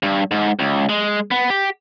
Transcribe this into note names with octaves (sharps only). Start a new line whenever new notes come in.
G2
G#2
C#2
G#3
B3
G4